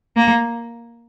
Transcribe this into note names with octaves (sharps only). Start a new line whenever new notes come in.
A#3